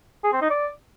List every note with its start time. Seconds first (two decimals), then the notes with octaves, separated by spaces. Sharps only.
0.24 G#4
0.33 C4
0.42 D#4
0.50 D5